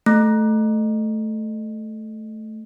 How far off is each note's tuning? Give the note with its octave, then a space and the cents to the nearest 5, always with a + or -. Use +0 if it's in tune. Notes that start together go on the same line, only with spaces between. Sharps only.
A3 -10